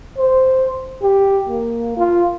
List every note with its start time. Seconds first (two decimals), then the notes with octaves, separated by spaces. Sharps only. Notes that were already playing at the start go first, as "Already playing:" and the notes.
0.18 C5
1.03 G4
1.49 A#3
1.97 F4